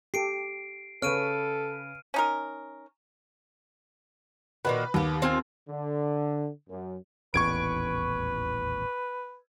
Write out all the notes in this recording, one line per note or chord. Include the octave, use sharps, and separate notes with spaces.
G4 A4 C7 D7
C#3 A4 B4 C#5 F6 D7 D#7
C#4 D#4 A#4
A#2 D#3 F#4 B4
D#2 B3 G4
C4 F4 G#5
D3
F#2
D#1 A1 E2 B4 C#6 G#6 D7